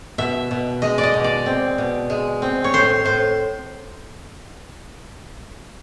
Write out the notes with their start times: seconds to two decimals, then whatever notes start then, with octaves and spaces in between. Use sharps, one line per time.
0.18 B2 E5
0.51 B2
0.82 G#3 D#5
0.98 D5
1.03 D#5
1.14 B2
1.24 D5
1.46 C4
1.78 B2
2.10 G#3
2.42 C4
2.64 C#5
2.73 A2 C5
3.05 A2 C5